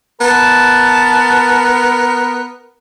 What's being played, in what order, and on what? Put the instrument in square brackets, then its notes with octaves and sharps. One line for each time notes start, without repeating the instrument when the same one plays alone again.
[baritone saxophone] B3 [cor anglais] A#4 [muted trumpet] A5